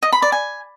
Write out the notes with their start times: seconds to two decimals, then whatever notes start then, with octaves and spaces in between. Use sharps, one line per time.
0.03 D#5
0.12 B5
0.22 D5
0.32 G#5